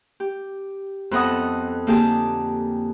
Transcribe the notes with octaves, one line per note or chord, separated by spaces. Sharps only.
G4
F2 B3 A4 D#5 F#5 D#6
D3 A#3 D#4 G4 G#4 A5